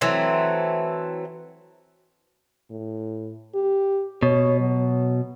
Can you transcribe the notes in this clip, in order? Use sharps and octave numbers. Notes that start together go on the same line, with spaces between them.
E3 F#3 A3 C4
A2
G4
B2 C#5
F#3